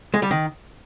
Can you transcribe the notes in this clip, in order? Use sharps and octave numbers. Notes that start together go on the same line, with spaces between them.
G#3
G3
D#3